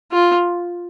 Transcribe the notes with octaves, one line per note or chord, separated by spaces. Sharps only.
F4